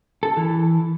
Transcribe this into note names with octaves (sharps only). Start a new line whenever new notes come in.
A4
E3